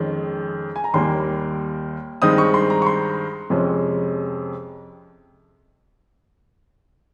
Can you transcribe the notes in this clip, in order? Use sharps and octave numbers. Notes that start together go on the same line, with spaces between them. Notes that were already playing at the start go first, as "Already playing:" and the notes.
Already playing: F2 D#3 G#3 C#4
G#5
A#5
D#2 D#3 G3 A#3 C6
G2 D#3 G#3 C4 D#4 D#6
C#6
C6
A#5
C#6
C6
F2 C3 F3 G#3 C#4